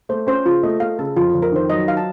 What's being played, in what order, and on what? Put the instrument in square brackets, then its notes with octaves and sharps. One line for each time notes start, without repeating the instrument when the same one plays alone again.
[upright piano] A3 [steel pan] C5
[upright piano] C#4 [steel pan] C5
[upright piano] C#3 [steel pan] F4
[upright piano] A3 [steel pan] D#5
[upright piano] A3 [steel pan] F5
[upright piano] C#3 [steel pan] A4
[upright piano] F2 [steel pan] F4
[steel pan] F4
[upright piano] F2
[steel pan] A#4
[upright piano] D#3 [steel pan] C5
[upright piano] F#3 [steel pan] D#5
[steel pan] F5
A5